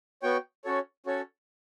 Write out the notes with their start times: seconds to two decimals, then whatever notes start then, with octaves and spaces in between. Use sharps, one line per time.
0.22 B3 F#4 C#5 G5
0.65 C#4 F#4 A4 C#5
1.06 C#4 F#4 A4 C#5